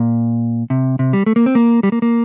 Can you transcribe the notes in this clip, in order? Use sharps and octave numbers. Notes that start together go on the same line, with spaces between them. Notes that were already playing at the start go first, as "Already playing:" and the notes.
Already playing: A#2
C3
C3
G3
A3
A#3
C4
A#3
G3
A#3
A#3